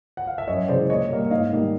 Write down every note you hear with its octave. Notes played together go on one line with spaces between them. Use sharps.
F#5
F5
E5
F#2 C#5 D#5
C#3 E3 G#3 C5 D5
A#2 C#5 D#5
G3 A#3
G#2 D#5 F5
D#3 G3 A#3